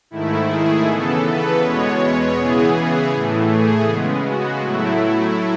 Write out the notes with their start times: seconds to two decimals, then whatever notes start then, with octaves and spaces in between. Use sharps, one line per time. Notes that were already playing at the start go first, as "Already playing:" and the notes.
0.11 G#2 D#3 A3 E4
0.48 G#4
0.86 C#3 E3 B3 A4
1.24 B4
1.61 E2 B2 G#3 B3 C#5
2.36 C#3 E3 B3 G#4
2.74 G#4
3.11 A2 E3 A3
3.49 G#4
3.86 C#3 G#3 B3
4.24 F#4
4.61 A2 F#3 A3 E4